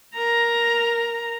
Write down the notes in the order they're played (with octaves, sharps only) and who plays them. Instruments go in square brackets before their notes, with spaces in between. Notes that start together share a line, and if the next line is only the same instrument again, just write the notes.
[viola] A#4 A#5